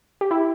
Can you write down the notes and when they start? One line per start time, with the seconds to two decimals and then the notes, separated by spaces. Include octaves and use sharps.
0.21 G4
0.31 E4